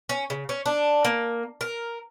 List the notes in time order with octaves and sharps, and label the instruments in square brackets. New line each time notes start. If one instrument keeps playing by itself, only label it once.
[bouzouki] C#4
C#3
C#4
D4
A#3
A#4